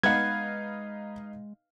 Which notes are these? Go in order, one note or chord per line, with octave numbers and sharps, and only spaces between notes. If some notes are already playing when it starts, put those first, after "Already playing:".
G#3 B3 D#4 B4 F5 F#5 G#6